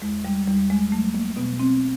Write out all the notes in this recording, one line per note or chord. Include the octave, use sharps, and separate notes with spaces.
E2 G#3
G3
E2 G3
G#3
F#3 A3
A#3
B2 B3
C4